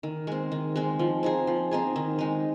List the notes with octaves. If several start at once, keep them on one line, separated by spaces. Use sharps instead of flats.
D#3
G#3 C4
D#3
G#3 C4
F3
C4 D#4 G#4
F3
C4 D#4 G#4
D#3
G#3 D#4